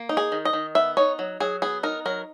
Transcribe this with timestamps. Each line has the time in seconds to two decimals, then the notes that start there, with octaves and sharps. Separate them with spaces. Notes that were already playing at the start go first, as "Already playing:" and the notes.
Already playing: A#3
0.09 D#4
0.17 G#4
0.32 D#3
0.45 D#5
0.53 D#3
0.75 B3 E5
0.97 D#4 C#5
1.19 F#3
1.40 F#3 G#4
1.62 B3 G#4
1.83 D#4 A#4
2.05 F#3 A#4